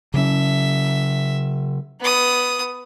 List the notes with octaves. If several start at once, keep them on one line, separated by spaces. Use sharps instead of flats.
C#3 F#3 C#4 E5
B3 D#6